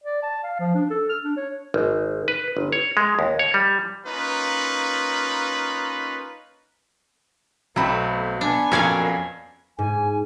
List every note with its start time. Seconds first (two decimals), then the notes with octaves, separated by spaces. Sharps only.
0.04 D5
0.23 A5
0.43 F5
0.60 F3
0.75 D4
0.90 A4
1.09 F6
1.23 D4
1.36 C#5
1.74 G#1
2.28 B4
2.57 G1
2.73 C#5
2.97 G#3
3.19 D#2
3.39 C#5
3.54 G3
4.06 A#3 C#4 D#4 F4 B4
7.76 B1 F#3 A3 B3 C4 B5
8.41 B3 D4 G#5
8.72 F2 A#2 F#3 A#3 C#4 D5 F5 G#6
9.79 G#2 G#5